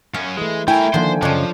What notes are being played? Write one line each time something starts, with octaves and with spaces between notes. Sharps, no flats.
F#2 C#4 F5
E3 G#3 A3
A3 E4 A#4 G5 G#5
D3 D#3 F3 A#3 C5
F#2 C#3 F3 D4 C#5 D#5